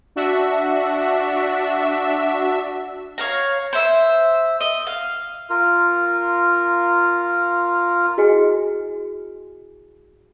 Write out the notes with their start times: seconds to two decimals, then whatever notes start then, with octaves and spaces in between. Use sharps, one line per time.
0.16 D4 F#4 E5
3.18 C#5 F5 A#5
3.73 C5 E5
4.61 D#5
4.87 F5
5.50 F4 A#4
8.18 E4 F#4 G#4 D#5 G5 G#5